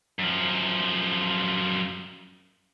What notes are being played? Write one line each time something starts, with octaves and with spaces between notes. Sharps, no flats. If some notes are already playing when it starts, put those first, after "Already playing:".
F#2 F3